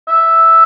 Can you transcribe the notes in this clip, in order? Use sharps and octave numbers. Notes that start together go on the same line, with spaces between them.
E5